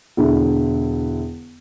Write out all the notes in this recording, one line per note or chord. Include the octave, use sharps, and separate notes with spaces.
E1 D3 E4